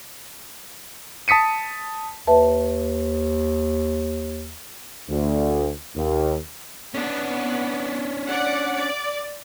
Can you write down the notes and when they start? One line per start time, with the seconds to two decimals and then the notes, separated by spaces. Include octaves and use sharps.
1.28 A5 D#6 B6 C#7 D#7
2.27 D#2 B4 E5 A5
5.10 D2
5.96 D#2
6.94 B3 C#4 D4
8.26 D5 F#5
8.75 D5